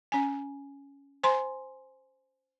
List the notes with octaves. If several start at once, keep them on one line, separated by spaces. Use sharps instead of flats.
C#4 G#5
C5 G#5 A#5 C6